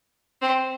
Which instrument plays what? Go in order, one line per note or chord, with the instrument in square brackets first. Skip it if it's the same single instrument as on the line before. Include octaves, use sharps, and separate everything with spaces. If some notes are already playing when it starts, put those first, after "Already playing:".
[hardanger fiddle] C4